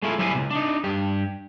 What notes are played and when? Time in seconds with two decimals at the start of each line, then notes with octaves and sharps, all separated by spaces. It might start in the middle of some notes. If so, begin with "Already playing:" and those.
0.02 G#3 A3 E4 F4
0.18 F#3 G3 E4 B4 C5 G#5
0.35 C#2 B2
0.51 D4 D#4
0.84 G2 G4